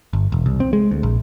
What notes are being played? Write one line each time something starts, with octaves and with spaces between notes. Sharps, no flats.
G1
E1
C2
C4
G#3
D2
A#1